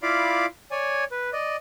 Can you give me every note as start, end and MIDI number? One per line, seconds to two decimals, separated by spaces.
0.03 0.46 64
0.03 0.46 65
0.03 0.46 74
0.03 0.46 77
0.03 0.46 83
0.03 0.46 86
0.71 1.04 73
0.71 1.04 74
0.71 1.04 80
1.12 1.30 71
1.33 1.56 74
1.33 1.56 75